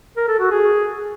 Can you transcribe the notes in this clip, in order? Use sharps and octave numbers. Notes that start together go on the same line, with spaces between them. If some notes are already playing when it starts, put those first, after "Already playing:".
A#4
A4
F#4
G#4